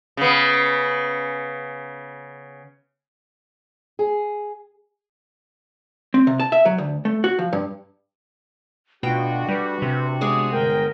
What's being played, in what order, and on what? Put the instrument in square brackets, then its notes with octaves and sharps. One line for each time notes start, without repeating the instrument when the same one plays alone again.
[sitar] C#3 B3
[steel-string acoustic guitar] G#4
[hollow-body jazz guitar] C4
C3
A5
E5
F#3
D2
A3
F#4
F3
G2
[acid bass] B2 [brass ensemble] A3 D4 F#4 [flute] F4 [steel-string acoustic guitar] G5
[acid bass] G3 [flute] B4
[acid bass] C3
[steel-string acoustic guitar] G#3 B3 G#4 [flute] D6
[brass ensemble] G1 G5 [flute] A#4